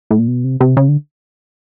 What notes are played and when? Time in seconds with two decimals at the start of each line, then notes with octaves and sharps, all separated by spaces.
0.11 A2
0.19 A#2
0.28 B2
0.44 C3
0.60 C3
0.77 C#3
0.88 D3